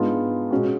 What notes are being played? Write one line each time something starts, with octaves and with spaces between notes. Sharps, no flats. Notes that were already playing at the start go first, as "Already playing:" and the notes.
Already playing: G#2 G#3 B3 D4 F4
B2 G#3 C#4 F#4